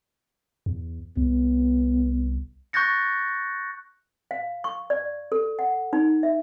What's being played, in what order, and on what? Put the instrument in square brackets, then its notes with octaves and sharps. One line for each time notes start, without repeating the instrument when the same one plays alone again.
[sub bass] E2
[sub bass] C2 [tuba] B3
[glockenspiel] C#6 F#6 G6 A6 A#6 C#7
[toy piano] F5
C#6
D5
A4
F#5
D#4
E5